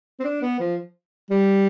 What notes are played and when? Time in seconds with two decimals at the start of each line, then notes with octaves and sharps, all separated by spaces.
0.19 C4
0.24 D4
0.42 B3
0.59 F3
1.30 G3